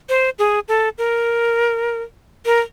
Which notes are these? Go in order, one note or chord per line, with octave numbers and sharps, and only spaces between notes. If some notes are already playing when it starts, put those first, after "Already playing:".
C5
G#4
A4
A#4
A#4